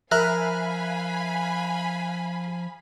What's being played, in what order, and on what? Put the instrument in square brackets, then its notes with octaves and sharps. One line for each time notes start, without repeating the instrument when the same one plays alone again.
[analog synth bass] F3 [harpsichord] A#4 [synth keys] E5 F#6 [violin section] F5 G#5 B5